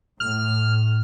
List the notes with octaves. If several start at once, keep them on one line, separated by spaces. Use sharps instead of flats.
A2 F6